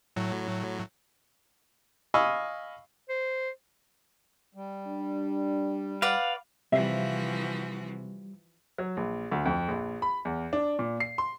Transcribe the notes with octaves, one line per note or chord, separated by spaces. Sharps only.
A2 F#3
D#5 F5 G#5 B5 C#6 E6
C5
G3
D4
B4 D5 F5 F#5
C3 E3 F3 G3 F#4 E5 F5
F#3
A#1
D2
F2
A#1
B5
E2
D4
A#2
C7
C6